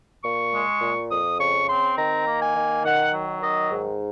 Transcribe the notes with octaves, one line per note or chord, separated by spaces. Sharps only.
A#2 C#6
G#3
A#2
F2 D#6
C#3 C#6
C4 C6
D#3 A#5
A#3
G#5
D#3
D#3 F#5
F#3
D#3 D#5
G#2